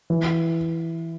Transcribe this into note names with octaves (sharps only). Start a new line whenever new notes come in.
E3